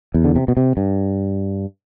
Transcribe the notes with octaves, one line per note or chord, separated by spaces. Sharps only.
E2
D3
C3
B2
C3
G2